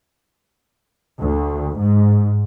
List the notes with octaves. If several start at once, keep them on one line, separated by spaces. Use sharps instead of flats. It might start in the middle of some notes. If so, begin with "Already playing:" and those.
D2
G#2